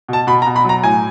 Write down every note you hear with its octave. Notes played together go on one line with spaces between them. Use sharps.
B2 A5
B2 B5
A#5
B2
B5
F#3 A#5
A2 G#5